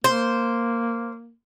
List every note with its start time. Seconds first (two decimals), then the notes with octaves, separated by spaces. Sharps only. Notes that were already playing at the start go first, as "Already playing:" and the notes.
0.04 A#3 C5